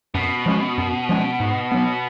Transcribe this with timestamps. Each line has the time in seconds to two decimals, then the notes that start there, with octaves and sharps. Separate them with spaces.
0.14 F#2 B2
0.46 F3 G#3 C#4
0.78 F#2
1.09 F3 G#3 C#4
1.40 G#2
1.72 F#3 B3